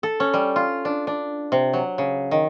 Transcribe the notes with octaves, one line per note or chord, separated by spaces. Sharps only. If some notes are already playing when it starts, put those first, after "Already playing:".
A4
C#4
G3
F4
D4
D4
C3
F#3
C#3
D#3